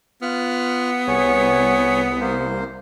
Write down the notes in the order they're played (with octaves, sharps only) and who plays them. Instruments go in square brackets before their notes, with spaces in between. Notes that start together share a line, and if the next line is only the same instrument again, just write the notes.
[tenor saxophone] B3 [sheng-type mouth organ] F4 F6 F#6
[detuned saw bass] C2 [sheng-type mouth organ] G#4 C#5
[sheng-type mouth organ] A#3 C5